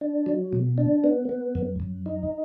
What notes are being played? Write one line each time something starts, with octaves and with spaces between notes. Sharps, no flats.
D4
F#3
B2
D4
B3
B3
F#2
F#2
D#4